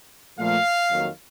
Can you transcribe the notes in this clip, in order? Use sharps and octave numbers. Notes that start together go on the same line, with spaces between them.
A#2 F3 A3 F5
F2 D#3 F#3 A#3